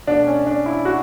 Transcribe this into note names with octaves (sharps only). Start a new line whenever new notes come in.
B2 A3 D4
C#4
D4
E4
F#4